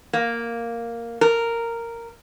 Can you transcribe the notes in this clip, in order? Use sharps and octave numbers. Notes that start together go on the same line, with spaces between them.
A#3
A#4